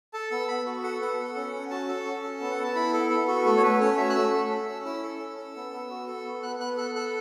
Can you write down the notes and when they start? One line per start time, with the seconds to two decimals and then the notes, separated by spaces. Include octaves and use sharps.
0.13 A4 A5
0.31 B3 E6
0.48 B3 B5
0.66 F#4
0.83 A4 F#5
1.01 B3 F#5
1.19 A4
1.36 C#4
1.53 C#4
1.71 F#4 A5
1.89 A4
2.05 C#4
2.23 A4
2.41 B3
2.51 F#5
2.58 B3
2.63 A5
2.75 E4 B5
2.94 A4
3.10 B3 A4
3.28 F#4 A4
3.45 A3 A4
3.57 C#5
3.63 A3 B4
3.80 C#4 C#5
3.97 F#4 E5
4.10 F#6
4.15 A3 E6
4.33 A4
4.50 C#4
4.68 C#4
4.85 E4 E6
5.03 A4
5.20 C#4
5.38 A4
5.56 B3
5.73 B3
5.90 F#4
6.07 A4
6.25 B3
6.43 B3 F#6
6.59 B3 F#6
6.77 A4 F#6
6.95 A4 F#6